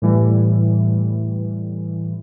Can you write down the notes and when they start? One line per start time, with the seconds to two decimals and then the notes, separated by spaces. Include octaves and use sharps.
0.02 A2 E3 G3